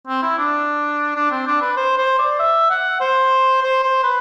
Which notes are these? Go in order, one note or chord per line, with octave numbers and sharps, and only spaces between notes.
C4
E4
D4
D4
C4
D4
B4
C5
C5
D5
E5
F#5
C5
C5
C5
B4